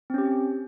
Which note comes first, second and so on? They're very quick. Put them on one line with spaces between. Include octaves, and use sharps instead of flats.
C4 C#4 G4